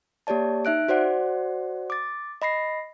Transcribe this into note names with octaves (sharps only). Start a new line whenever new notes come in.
A#3 G4 C#5 D5 A5
D#4 E5 F#6 D7
F#4 C5 D5 F#5
D6 A6
D#5 B5 A#6 C7